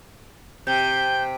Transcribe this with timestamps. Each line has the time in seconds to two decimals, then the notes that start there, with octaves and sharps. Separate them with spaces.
0.67 C3 G5 G6